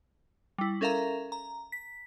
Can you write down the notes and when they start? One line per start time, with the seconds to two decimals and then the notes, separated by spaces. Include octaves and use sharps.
0.58 G3 E4
0.81 C#4 A4 A#4 E5 F5 A#5
1.32 A#5
1.72 B6